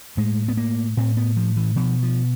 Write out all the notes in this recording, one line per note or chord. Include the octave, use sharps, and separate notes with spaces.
A2 G#3
B3
A#3
A2 C4
B3
F3
E3
B2 F3
F3